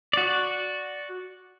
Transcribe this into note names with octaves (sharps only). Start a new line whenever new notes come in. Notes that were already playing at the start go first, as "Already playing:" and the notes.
F#4 D5